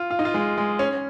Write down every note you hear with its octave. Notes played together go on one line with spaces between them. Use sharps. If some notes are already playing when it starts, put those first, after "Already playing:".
Already playing: F4
F4
D#4
F4
G#3
G#3
C#4